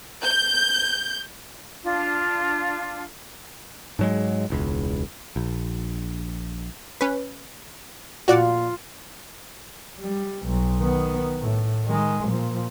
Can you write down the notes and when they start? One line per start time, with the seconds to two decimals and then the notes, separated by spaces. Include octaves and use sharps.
0.24 G6
1.83 D4 F4
3.99 G#2 F#3 G#3
4.50 E1 C#2
5.36 A#1
7.01 C#4 B4
8.28 A#2 F4 F#4 D5 F5 F#5
9.99 G3
10.47 B1
10.79 D#3 B3
11.41 A2
11.85 D#3 G#3
12.24 A#2 F3